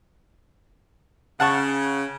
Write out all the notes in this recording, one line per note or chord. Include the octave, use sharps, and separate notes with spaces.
C#3 F#5 A5 C#6